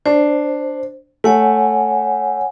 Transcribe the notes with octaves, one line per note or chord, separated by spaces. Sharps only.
D4 C5
A3 C#5 F#5 G#5